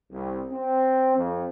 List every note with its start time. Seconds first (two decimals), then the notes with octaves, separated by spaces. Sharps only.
0.11 C2
0.52 C4
1.16 F2